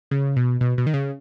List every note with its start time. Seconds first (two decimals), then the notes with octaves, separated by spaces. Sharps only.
0.11 C#3
0.36 B2
0.61 B2
0.78 B2
0.86 D#3
0.94 C#3